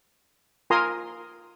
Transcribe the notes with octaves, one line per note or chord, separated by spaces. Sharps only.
F4 A#4 G#5 A#5 C6 D#6